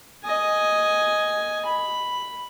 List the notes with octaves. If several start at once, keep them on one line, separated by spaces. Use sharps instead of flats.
D#5 G#5
B5